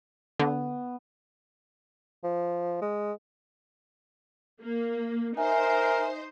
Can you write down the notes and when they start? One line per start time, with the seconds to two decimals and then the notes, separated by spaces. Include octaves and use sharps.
0.39 D3 B3
2.24 F3
2.82 G#3
4.61 A#3
5.37 D#4 A#4 C5 E5 G#5